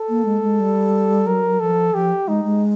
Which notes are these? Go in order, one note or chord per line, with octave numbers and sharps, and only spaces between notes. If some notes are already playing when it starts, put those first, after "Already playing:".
Already playing: A4
A#3
G#3
G#3
G3
F#3 A#4
F3 A4
F3 G4
G#3 D#4
G#3